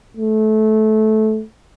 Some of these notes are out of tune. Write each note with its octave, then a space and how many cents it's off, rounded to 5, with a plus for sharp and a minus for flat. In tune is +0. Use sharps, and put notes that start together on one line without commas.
A3 -20